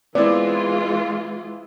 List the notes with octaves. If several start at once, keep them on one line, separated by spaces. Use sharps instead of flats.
E3 G#3 B3 C4 E4 F4 D5